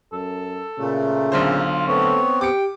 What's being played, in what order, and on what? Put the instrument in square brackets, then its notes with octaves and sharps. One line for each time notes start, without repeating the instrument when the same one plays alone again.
[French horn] F#2 [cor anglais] A4
[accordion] A#2 A3 [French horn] C#3
[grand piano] B1 D3 C5 [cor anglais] F4
[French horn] A3 [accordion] B3 C4 [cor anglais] C#5
[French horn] G4 [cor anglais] G5 [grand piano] D6 C#7